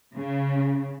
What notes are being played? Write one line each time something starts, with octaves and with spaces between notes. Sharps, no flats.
C#3